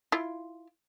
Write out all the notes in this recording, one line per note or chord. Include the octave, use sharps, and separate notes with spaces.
E4 F4